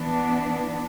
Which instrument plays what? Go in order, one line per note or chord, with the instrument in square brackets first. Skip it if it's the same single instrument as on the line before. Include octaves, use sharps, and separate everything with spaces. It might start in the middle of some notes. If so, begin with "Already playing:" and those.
Already playing: [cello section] E3 B3 D4